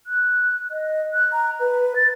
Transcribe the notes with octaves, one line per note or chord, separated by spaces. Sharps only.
F#6
D#5
F#6
A#5
B4
A6